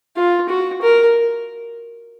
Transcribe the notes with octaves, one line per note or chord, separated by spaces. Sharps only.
F4
F#4
A#4